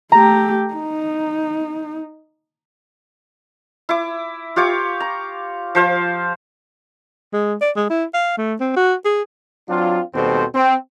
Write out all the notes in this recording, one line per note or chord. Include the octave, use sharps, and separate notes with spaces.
A3 G4 A#5
D#4
E4 D6
F4 G4 C#5 D6
A#5
F3 C5 F5
G#3
D5
G#3
E4
F5
A3
C4
F#4
G#4
F#3 C4 D4 F4
D#2 B2 G3 C4 A4 C5
C4